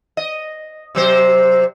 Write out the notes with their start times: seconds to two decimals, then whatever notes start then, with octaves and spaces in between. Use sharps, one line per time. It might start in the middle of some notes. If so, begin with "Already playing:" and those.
0.17 D#5
0.95 C3 F#3 C5